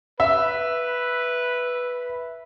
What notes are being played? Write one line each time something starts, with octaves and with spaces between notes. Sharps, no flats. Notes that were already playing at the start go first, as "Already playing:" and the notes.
B4 E5